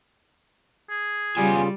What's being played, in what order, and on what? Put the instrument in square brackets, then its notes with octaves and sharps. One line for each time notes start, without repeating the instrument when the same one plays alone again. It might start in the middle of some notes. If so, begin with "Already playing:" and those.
[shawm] G#4
[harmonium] C#3 F4 [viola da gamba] G3 [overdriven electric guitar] B3 G#5